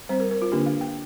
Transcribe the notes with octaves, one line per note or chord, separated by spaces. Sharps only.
G3 C4 C5
A#4
A#4
F4
D3 A#3 D4 G4
F5
G5